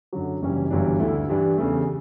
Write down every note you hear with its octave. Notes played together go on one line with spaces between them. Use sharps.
F#2 D3 F#3
F#1 F#2 E3 G3 C#4
G1 F#2 E3 G3 D4
D2 D3 A3 E4
G2 E3 G3 D4
E2 C#3 E3 A3